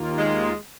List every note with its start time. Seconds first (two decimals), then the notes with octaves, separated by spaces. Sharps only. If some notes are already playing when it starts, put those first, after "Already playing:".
Already playing: D#2 D#3 A#3 F4
0.18 G#3